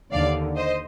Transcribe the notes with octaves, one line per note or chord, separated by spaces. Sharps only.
D#2 D3 D5 F5
C5 D#5